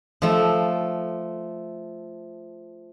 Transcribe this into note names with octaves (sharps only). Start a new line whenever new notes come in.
F3 A3